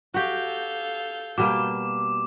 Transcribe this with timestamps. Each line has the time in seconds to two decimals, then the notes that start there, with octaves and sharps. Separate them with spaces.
0.14 F#4 G4 A4 F5 G6
1.38 B2 G3 A#3 D6